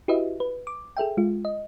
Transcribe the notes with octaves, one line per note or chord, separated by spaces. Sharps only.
E4 F#4 G4 B4 D#5 E5
B4
D6
G#4 A4 E5 G5
G#3 F4
D#5